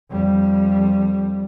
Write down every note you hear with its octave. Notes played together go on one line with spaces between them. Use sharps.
F2 G3